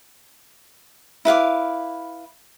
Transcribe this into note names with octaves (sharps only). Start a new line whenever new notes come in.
E4 B4 F5 D6